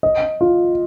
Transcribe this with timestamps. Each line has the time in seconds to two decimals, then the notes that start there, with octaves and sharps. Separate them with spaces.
0.03 D#5
0.41 F4